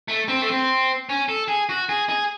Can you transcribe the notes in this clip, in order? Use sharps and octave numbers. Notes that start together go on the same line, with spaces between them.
A3
C4
A3
C4
C#4
A4
G#4
F#4
G#4
G#4